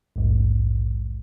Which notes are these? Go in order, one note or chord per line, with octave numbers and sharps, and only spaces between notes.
A#1 D#2 G#2